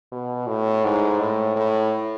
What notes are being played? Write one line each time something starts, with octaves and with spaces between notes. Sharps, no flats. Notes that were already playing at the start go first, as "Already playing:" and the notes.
B2
A2
G#2
A2
A2